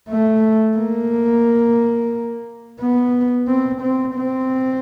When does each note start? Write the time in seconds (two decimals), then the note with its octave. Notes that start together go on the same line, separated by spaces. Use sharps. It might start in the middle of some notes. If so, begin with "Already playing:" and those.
0.09 A3
0.78 A#3
2.80 B3
3.48 C4
3.82 C4
4.16 C4